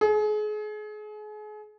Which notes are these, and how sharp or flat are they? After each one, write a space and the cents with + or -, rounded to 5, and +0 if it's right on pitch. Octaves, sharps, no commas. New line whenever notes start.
G#4 +35